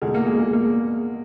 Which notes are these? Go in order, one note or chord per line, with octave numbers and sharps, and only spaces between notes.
E2 B2 G#3
A#3
G#3
G#3
A#3